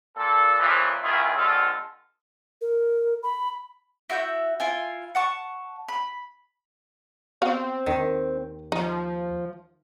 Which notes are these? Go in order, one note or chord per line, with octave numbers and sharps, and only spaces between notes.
A#2 A4
F2 A#2 C#3 E3 F3
C#2 F#2 D#3 E4 F4 G#4
A#1 D3 G#3 F4 A4
A#4
B5
E4 F#4 E5 G6
E4 F4 G#5
F#5 A5 C#6
B5
B3 C4 F#4 F5
D#2 D#3
F3 D#4